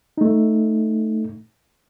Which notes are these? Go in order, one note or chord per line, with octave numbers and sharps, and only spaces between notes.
A3 D#4